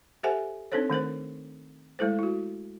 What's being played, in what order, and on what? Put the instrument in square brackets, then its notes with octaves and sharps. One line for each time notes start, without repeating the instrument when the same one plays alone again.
[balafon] G4 A4 C5 E5 F#5 G#5
C4 D4 D#4 A4 C5 C#5
D#3 A3 A#4 C5
G#3 A3 E4 A4 C5
E4 F#4